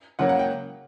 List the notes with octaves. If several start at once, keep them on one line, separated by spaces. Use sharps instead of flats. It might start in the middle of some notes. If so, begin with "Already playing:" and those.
C#3 F#3 A#3 F#5
F#5
G5